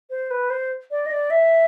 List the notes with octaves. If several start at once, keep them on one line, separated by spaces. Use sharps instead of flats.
C5
B4
C5
D5
D#5
D5
E5